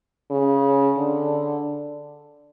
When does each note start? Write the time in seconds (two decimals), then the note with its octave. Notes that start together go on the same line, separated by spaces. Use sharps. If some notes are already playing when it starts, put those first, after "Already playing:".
0.31 C#3
0.98 D3